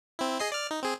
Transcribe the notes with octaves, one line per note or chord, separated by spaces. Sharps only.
C4 E4
G#4 D#5 C7
D5 F6
D#4
C4 G#4